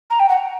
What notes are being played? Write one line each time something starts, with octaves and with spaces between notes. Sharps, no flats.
A#5
G5
F#5